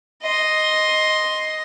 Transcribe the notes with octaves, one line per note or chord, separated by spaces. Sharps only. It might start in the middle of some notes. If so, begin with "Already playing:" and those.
D#5 C6